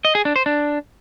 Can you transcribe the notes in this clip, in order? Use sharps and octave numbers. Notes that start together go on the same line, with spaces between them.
D#5
G#4
D4
C5
D4